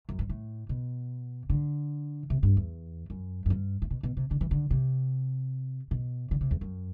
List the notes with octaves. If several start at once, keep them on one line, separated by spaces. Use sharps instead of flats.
F#2
G2
A2
B2
D3
C3
G2
E2
F#2
F#2
G2
A2
B2
B2
C3
D3
E3
D3
C3
B2
D3
C3
E2
F#2